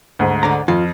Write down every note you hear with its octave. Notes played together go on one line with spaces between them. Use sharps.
D2 G#2
D3 D5 A#5
F2 F4